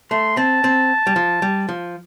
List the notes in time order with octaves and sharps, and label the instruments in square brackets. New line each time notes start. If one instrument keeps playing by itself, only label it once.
[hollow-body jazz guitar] A3 [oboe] C6
[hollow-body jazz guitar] C4 [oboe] A5
[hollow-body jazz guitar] C4
G3
F3
G3
F3